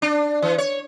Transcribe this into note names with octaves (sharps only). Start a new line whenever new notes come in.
D4
E3
C#5